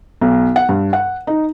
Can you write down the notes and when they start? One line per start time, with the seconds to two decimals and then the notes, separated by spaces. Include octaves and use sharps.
0.21 B1
0.56 F#5
0.69 G2
0.93 F#5
1.27 D#4